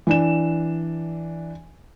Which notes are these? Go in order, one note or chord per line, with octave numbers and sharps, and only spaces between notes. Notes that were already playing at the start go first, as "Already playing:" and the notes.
E3 D4 E7